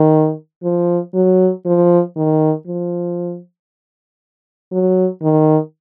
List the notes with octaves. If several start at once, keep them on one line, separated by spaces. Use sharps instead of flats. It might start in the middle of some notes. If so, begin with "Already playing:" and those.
Already playing: D#3
F3
F#3
F3
D#3
F3
F#3
D#3